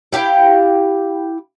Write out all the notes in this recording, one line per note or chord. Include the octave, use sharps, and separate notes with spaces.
E4 G4 F5 G5